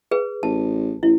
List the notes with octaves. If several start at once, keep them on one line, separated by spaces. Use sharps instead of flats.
G#4 B4
A1 A5
A1 E4